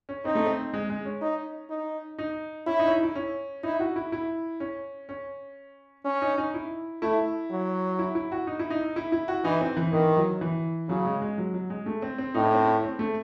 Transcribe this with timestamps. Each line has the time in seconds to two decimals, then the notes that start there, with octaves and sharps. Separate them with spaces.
0.09 C#4
0.25 C4 D#4
0.35 A3
0.46 C4
0.73 G#3
0.90 G#3
1.05 C#4
1.22 D#4
1.70 D#4
2.18 D#4
2.67 C#4 E4
2.79 D#4
2.86 C#4
2.91 D#4
3.03 E4
3.15 C#4
3.63 D#4 E4
3.80 F#4
3.96 E4
4.12 E4
4.60 C#4
5.09 C#4
6.05 C#4
6.22 D#4
6.38 D#4
6.54 E4
7.02 A3 E4
7.51 F#3
7.99 E4
8.15 E4
8.32 F#4
8.47 D#4
8.59 E4
8.70 D#4
8.96 E4
9.12 E4
9.28 F#4
9.44 E3 D#4
9.61 C4
9.77 E3
9.92 D#3 E3
10.17 F#3
10.41 E3
10.89 C#3 F#3
11.05 G#3
11.22 G#3
11.38 F#3
11.54 F#3
11.70 G#3
11.86 A3
12.02 C4
12.18 C4
12.34 A2 D#4
12.45 C#4
12.55 C4
12.65 C#4
12.83 C4
12.99 A3